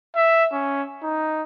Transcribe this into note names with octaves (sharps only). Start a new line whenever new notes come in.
E5
C#4
D#4